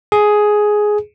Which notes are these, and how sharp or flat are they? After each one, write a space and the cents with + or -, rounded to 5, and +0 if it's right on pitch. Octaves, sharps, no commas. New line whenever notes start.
G#4 +10